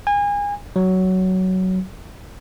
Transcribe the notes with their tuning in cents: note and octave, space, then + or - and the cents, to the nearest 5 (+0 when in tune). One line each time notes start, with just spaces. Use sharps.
G#5 -30
F#3 +10